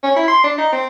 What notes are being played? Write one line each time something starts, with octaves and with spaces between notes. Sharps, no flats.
C#4
E4
C6
D4
D#4
C4